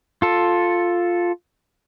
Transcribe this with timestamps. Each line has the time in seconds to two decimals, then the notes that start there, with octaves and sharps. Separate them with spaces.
0.22 F4 A4